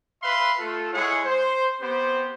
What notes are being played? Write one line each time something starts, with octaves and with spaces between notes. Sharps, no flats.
B4 E5 F5 B5 C6
A3 F4 A4
G#3 E4 G#4 C#5 F#5
C5
B3 C4 G4 C5